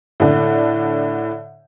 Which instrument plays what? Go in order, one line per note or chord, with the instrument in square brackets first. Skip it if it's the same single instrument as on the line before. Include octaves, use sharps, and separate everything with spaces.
[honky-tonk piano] A2 D3